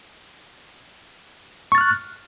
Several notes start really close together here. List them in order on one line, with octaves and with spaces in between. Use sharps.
C#6 A6 F6 F#6